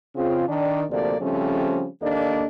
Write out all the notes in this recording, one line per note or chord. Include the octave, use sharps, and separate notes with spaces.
C#3 C4 F4
D#3 D4 D5
D2 C3 F3 A#3 A4 D5
C#3 F3 G3 A3 C4 C#4
D#2 A#3 D4 A4 D5 D#5